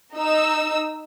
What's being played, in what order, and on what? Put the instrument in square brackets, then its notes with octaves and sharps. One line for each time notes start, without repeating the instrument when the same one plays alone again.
[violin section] D#4 E6